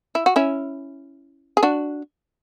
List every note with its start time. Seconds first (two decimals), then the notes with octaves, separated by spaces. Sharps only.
0.15 E4
0.26 F#4
0.36 C#4 E4
1.57 G#4
1.63 D4 F#4